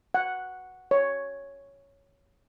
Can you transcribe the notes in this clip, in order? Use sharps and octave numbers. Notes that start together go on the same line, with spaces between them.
F#5
C#5